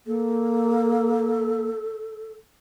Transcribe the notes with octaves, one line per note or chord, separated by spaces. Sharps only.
A#3 A4